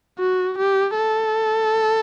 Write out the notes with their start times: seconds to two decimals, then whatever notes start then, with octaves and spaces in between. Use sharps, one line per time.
0.19 F#4
0.58 G4
0.97 A4